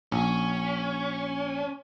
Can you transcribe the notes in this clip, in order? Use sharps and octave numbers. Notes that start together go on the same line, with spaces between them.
A#1 C#4